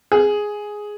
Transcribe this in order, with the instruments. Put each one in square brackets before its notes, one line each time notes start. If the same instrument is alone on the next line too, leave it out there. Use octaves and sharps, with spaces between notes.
[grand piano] G#4